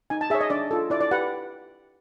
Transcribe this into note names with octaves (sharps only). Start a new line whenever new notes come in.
D#4 G#5
A5
G#4 C#5 E5
D#5
D4 D5
F4 A4
E4 D5
D5
G4 B4 F#5